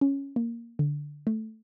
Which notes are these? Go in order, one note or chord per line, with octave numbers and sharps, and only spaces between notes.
C#4
A#3
D3
A3